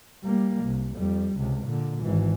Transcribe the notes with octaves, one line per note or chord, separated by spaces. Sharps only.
G3 A#3
C2
F2 G3
C#2 C3
A#2 D3
G#1 E3